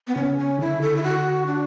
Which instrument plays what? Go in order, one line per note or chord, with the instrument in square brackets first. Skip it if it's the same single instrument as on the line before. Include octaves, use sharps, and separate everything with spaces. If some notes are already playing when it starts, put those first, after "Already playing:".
[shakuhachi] B3
[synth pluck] C#3 [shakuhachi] C#4
[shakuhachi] C#4
[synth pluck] D3 [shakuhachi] E4
[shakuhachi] A4
E4
F#4
D4